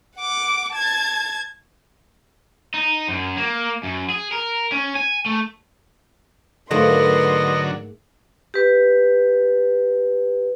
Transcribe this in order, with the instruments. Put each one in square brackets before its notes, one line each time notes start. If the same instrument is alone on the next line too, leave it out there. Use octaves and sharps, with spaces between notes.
[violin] F#5 D6
A5 G#6
[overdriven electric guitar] D#4
F#2
A#3
F#2
G#4
A#4
C#4
G#5
A3
[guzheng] G#2 A3 A#3 [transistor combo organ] D3 F#3 [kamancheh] B4 C6 [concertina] D#5
[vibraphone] G4 B4